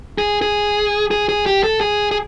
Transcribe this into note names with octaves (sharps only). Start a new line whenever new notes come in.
G#4
G#4
G#4
G#4
G4
A4
G#4
G#4